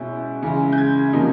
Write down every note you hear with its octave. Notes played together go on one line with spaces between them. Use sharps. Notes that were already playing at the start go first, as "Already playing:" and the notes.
Already playing: B2 G#3 C#4 E4 G6
C#3 E3 G#3
G6
G#6
C3 F3 A#3 D#4